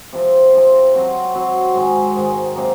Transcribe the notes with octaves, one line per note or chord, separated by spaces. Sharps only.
C3 F3 C4
C3 F3 C4
F#3 C4 F#4 C5
F#3 C4 F#4 C5
G#2 D#3 G#3
G#2 D#3 G#3
C3 F#3 A#3 D#4